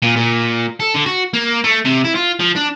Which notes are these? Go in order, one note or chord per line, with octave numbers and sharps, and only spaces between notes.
A#2
A#2
A4
D3
F#4
A#3
A3
C3
E4
F4
F3
D4